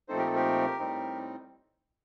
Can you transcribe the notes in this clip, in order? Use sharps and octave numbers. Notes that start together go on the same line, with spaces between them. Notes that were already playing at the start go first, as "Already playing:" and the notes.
A#2 F3 A3 C4 D#4 A4 C5
G4 A#4
A4
G4 A#4
A2 G3 C4 D#4